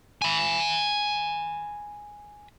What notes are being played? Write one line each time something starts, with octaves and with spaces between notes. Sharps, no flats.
G#5 B5